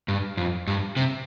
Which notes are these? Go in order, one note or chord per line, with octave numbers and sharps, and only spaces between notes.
G2
F2
G2
C3